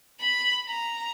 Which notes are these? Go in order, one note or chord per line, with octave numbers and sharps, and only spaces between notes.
B5
A#5